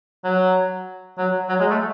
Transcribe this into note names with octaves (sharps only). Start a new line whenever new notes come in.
F#3
F#3
F#3
G#3
A3